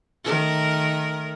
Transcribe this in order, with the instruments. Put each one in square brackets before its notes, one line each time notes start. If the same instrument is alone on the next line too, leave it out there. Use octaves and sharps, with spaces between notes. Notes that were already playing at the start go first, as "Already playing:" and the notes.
[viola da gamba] D#3 A3 A#4